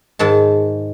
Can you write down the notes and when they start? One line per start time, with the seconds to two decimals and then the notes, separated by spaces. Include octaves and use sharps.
0.19 G#2 D#3 A5